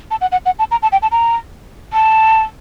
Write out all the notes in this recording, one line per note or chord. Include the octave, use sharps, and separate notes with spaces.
A5
F#5
F#5
F#5
A5
A#5
A5
G5
A5
A#5
A5